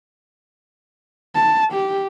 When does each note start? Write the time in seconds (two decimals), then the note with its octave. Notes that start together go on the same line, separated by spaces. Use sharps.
1.35 A5
1.73 G4